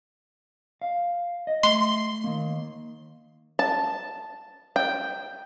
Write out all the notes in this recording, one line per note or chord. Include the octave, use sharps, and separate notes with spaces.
F5
D#5
A3 C6
D#3 A#3
A5
G5